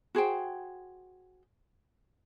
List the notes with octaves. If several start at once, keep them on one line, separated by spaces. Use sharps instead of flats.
F#4 G#4 C5 G5